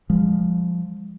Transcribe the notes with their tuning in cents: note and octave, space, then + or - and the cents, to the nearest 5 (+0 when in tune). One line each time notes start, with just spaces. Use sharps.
F3 +0 G#3 -35